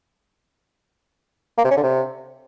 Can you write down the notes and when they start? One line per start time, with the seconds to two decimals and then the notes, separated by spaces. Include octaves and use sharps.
1.58 A#3
1.64 C3
1.71 C#4
1.77 D3
1.83 C3